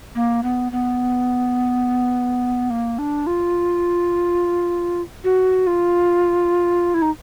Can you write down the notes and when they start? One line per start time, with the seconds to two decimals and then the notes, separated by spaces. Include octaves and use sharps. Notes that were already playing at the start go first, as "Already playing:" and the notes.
0.15 A#3
0.43 B3
0.72 B3
2.70 A#3
2.98 D4
3.27 F4
5.24 F#4
5.67 F4
6.94 E4
7.02 D#4